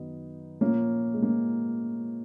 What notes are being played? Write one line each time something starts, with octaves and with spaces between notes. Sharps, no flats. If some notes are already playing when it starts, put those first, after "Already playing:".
Already playing: F#2 D#3 F#3 B3 D#4
A#2 F3 A#3 C#4
G#3
A#3